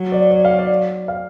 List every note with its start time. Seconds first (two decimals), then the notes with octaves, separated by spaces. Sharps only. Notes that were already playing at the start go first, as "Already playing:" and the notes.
Already playing: F#3
0.12 D5
0.31 D5
0.45 F5
0.59 D5
1.08 F5